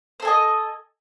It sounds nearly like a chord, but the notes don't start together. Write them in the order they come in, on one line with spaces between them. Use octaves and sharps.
C5 A4 G#5 D#5